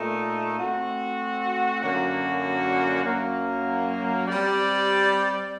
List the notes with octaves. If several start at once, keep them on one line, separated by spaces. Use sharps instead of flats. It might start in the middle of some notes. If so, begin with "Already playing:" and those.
Already playing: A#2 A3 D#4
A3 C4 F#4
F#2 D3 F#3 A#3 F#4
F#2 F#3 A#3
G3 C4 G4 D5